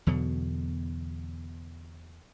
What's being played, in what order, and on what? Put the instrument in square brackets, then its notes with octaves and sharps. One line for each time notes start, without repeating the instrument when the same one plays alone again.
[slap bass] E2 B2 D3 F#3